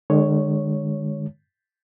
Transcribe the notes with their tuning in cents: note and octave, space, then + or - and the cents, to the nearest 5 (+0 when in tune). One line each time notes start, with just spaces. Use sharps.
D3 +45 G#3 +0 C#5 +0